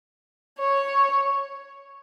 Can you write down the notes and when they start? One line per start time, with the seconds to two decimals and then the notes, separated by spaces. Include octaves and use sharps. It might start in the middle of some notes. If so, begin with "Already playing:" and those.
0.60 C#5